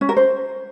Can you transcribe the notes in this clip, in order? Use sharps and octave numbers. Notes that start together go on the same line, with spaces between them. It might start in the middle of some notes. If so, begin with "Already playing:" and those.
C#4
A#4
C5